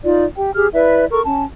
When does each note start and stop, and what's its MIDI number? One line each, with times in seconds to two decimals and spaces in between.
0.04 0.25 63
0.04 0.25 65
0.04 0.25 74
0.36 0.51 67
0.36 0.51 79
0.55 0.67 67
0.55 0.67 68
0.55 0.67 89
0.73 1.05 64
0.73 1.05 71
0.73 1.05 74
0.73 1.05 76
1.12 1.20 69
1.12 1.20 70
1.12 1.20 85
1.25 1.44 61
1.25 1.44 81